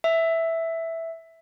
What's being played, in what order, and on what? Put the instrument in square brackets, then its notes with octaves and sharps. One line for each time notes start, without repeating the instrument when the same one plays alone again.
[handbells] E5